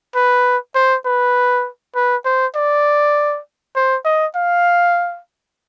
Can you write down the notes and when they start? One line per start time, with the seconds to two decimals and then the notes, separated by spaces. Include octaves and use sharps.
0.15 B4
0.75 C5
1.05 B4
1.95 B4
2.25 C5
2.55 D5
3.76 C5
4.05 D#5
4.36 F5